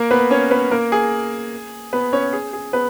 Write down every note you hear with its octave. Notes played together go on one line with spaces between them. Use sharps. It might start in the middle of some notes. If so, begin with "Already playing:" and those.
Already playing: A#3 A#4
B3 B4
C#4 C#5
B3 B4
A#3 A#4
G#4
B3 B4
C#4 C#5
G#4
G#4
B3 B4